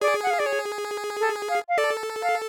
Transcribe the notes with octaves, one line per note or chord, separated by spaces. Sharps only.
G#4 D5
F#5
F5
D5
C#5
A4
F5
F5
A4 D5
F5